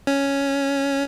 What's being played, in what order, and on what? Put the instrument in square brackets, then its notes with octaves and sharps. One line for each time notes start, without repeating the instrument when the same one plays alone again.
[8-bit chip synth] C#4